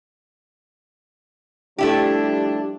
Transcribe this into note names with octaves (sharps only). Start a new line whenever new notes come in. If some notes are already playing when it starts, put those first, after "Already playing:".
F3 G3 A3 D4 E4 G4